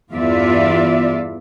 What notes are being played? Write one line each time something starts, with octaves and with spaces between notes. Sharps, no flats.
E2 G2 B3 F4 D5 E5